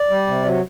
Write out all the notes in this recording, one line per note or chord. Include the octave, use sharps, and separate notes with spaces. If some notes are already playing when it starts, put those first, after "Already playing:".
Already playing: D5
G3
C3
F#3